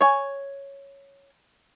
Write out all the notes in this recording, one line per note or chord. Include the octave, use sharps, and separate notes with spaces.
C#5 G#5